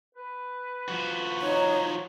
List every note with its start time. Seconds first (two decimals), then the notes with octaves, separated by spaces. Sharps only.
0.15 B4
0.88 F3 F#4
1.42 D#4 C#5